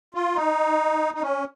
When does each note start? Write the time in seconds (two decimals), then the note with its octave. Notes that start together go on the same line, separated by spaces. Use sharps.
0.15 F4
0.36 D#4
1.14 D#4
1.22 C#4